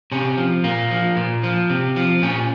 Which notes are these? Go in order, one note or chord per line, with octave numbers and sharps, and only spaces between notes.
C3 C#4
F3
A#2 A#3
F3
A#2
F3
C3
F3
A#2 C#4